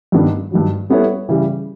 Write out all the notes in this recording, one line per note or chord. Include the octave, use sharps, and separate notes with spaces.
G2 D#3 G3 B3 D4
G2 D#3 F#3
G3 B3 E4 A4 C#5
C#3 E3 G3